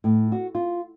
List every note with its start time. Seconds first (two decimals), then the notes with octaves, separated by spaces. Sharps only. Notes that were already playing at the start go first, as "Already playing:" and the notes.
0.04 A2
0.32 F#4
0.55 F4